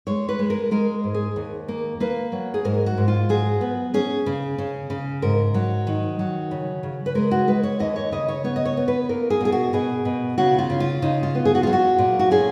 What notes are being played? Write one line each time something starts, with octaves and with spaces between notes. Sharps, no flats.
G#3 C#5
B4
G#3
A#4
G#3 A#4
G#2
G#4
D#2
A#3
A#3 B4
F#3
G#4
G#2 A#4
F#4
G#2
F4
F#3 G#4
B3
C#4 G#4
C#3
C#3
C#3
G#2 A#4
F#3
D#3
F#3
C#3
C#3
B4
G#3 A#4
F#4
G#3 B4
C#5
D#2 D#5
C#5
C#3 D#5
C#5
B3 C#5
D#5
C#5
B3
B4
A#3 A#4
G#4
B2 G#4
F#4
B2 G#4
B2
C#3 F#4
F4
C#3
F4
C#3 D#4
F4
B3
G#4
F#4
F#3 F4
F#4
A#2
F#4
C#4 G#4